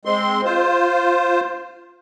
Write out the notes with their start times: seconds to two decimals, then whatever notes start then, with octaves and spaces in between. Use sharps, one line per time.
0.05 G#3 C4 C6
0.45 F4 C5